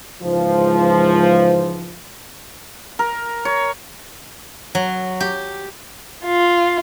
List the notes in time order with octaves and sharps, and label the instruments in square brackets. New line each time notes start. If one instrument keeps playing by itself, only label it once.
[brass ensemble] C#2 G#2 E3 F3
[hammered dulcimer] A#4
C#5
[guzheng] F#3
G4
[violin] F4